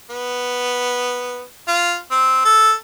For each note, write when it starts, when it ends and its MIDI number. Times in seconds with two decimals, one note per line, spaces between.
0.10 1.42 59
1.68 1.96 65
2.11 2.43 60
2.45 2.72 69